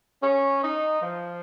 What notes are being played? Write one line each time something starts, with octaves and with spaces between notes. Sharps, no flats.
C#4
D#4
F3